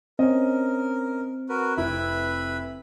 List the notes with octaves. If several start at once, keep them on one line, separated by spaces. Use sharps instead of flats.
C4 C#4 A#4 D#5
F#4 A#4 B4
F1 E4 B4 E5 B5